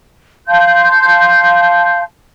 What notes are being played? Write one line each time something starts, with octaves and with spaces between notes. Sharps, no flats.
F5 A5 C6 G6